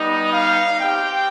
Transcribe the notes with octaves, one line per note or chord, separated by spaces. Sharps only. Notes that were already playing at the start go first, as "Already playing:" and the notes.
Already playing: G3 B3 D#4 D#5
F5
C4 G4 G5